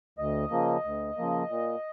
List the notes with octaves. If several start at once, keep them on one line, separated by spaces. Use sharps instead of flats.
D2 D#5
C#3 F3 A#3
D2
C#3 F3 A#3
A#2